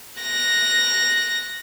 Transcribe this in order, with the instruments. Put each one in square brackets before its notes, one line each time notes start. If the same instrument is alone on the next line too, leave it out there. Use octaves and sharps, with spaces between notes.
[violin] F#6 A#6